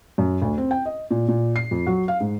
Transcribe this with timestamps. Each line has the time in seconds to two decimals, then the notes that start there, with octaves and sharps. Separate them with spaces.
0.18 F#2
0.42 D2
0.58 C4
0.71 G5
0.86 D#5
1.11 A#2
1.28 A#2
1.56 C7
1.71 F2
1.87 F#3
2.08 F5
2.20 G#2